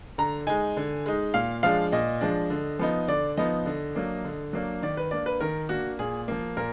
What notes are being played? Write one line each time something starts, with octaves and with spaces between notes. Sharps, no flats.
D3 A#5
G#3 D#4 G#5
D3
G#3 D#4
A#2 F5
F3 G#3 D4 F5
A#2 D#5
F3 G#3 D4
D3
F3 B3 D#4
D3 D5
F3 B3 D#4 D#5
D3
F#3 A#3 D4
D3
F#3 A#3 D4
D#3 D5
B4
A#3 D4 D5
B4
D#3 A#4
A#3 D4 F#4
A#2 G#4
F3 A#3
A#2 A#4